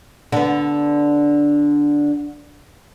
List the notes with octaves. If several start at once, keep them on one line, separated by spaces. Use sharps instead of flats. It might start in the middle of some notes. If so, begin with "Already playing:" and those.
D3 B3